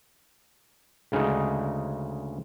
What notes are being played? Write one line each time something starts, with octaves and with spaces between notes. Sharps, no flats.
D2 C#3 G#3 D#4 F#5